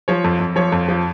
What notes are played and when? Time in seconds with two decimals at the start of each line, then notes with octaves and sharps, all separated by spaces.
0.08 F3 C#5
0.24 F2
0.40 F2
0.56 F3 C#5
0.72 F2
0.88 F3